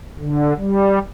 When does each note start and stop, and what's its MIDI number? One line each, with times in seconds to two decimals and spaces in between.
0.19 0.53 50
0.58 0.99 55